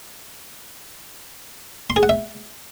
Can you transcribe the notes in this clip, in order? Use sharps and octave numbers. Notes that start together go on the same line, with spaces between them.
C6
G#4
F#5
E5